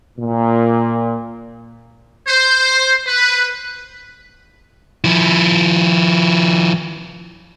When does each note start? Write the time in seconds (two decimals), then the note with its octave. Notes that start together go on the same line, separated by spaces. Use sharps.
0.18 A#2
2.28 C5
3.07 B4
5.04 F3 E4